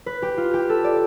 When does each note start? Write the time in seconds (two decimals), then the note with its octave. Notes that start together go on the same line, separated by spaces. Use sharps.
0.06 B4
0.22 G4
0.37 F4
0.54 G4
0.69 A4
0.84 D5